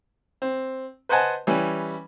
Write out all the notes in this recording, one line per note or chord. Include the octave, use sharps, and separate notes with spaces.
C4
B4 C5 D#5 F#5 G#5 A5
E3 G3 C#4 B4